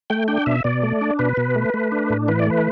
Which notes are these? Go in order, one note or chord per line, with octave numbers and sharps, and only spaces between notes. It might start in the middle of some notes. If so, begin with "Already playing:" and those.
A3 G5
D4 G5
B2 E5
B2 D5
A3
D4
B2 B4
B2
A3
A3
D4
A2
E3 B4
D5
A3 B4